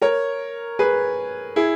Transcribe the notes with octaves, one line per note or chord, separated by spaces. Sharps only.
A#4 C#5
G#4 B4
E4 G#4